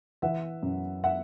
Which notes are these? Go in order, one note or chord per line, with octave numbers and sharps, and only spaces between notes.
E3 E5 F#5
F#2
E5 F#5